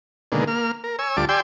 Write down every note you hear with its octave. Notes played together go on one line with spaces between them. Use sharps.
B2 D3 D#3 G#3 A#3
A#3 F6
A#4
C#5 G#5 E6
D2 G3 F4 A5 D6
G4 D5 G5 G#5 C6 E6